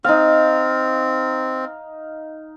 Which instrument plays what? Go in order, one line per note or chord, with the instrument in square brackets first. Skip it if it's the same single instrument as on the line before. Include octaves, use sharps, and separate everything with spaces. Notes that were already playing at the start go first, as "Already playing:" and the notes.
[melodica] C4 [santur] D#4 F5